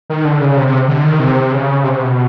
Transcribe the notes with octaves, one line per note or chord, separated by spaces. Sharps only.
D#3
D3
C#3
C3
C3
D3
D#3
C3
C#3
C3
B2